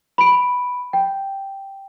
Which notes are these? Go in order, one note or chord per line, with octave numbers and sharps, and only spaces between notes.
B5 D7
G5